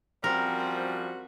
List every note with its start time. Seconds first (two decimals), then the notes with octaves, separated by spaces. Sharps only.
0.24 F#2 F3 G3 C4 F#4 A#4